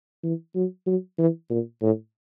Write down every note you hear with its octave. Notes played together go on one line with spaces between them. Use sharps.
E3
F#3
F#3
E3
A#2
A2